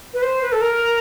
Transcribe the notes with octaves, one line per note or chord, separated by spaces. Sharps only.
B4
C5
B4
A4
A#4